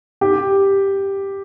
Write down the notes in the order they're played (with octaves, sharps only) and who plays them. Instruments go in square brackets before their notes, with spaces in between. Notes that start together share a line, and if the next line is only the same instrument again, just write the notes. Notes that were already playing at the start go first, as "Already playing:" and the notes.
[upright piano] G4